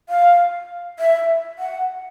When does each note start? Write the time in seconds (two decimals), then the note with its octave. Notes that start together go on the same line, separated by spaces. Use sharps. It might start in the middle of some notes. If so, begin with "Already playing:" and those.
0.09 F5
0.99 E5
1.59 F#5